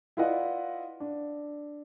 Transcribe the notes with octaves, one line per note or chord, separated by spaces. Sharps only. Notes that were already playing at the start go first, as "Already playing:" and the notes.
E4 F4 B4 D5 D#5 F#5
D4